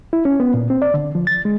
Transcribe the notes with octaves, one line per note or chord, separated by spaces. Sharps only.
E4
C#4
B3
A#2
C4
D5
D3
F3
A6
G#3